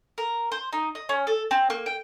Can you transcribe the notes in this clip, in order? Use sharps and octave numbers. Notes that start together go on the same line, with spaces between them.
A#4
C5
D#4
D#5
C#4
A4
C4
A#3
G5